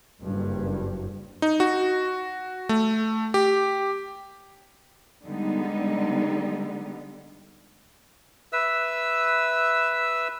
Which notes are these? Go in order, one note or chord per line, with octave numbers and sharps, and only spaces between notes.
F#1 G2
D#4
F#4
A3
G4
D3 G3 G#3 B3 D#4
B4 E5 E6